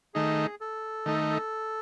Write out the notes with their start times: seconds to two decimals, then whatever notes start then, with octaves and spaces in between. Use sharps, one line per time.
0.14 D#3 A3 D#4 G#4
0.61 A4
1.06 D#3 A3 D#4